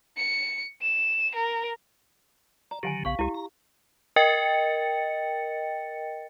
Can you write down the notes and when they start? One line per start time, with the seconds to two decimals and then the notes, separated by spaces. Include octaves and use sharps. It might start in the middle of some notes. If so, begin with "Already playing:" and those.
0.17 C#7
0.82 E7
1.35 A#4
2.71 D5 A#5
2.83 D3 D#3 F#3 G4 F#5 G#5
3.05 A#1 C#3 B3 F5 C#6
3.19 C#2 G#3 E4 G4
3.34 A#5
4.16 A#4 D#5 G5 A6 C#7